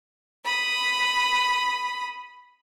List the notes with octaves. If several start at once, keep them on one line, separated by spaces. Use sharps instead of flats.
B5 D#6